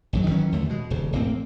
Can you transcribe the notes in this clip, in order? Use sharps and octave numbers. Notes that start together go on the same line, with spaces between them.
G#1 F#2 F#3
D#3 E3 F#3 C#4
D#2 D3 A3
B2 G#3
D#1 C#3
E1 A2 A#3 C4